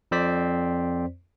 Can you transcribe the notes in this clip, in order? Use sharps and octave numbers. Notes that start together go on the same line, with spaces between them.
F2 C4 C5 D5 B6